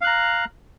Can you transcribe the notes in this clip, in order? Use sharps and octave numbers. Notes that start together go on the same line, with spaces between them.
F5 A#5 F#6